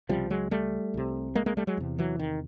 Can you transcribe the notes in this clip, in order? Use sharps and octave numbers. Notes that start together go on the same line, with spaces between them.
C#2 C3 F3 G3
F#3 G#3
G3 A3
C2 C3
G#3 A#3
G#3 A#3
G3 A3
F#3 G#3
E2 C3
E3 F#3
D#3